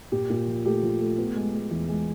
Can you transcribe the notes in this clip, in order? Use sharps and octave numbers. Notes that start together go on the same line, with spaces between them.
A#2 G4
A#2
F3
A3 G4
F3
A3
B3
G#3
G#3
E2
G#3